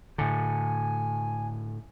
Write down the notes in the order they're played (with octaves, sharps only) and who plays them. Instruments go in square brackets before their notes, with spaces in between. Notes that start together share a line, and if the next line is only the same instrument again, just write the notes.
[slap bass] A2 D3 [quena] G#5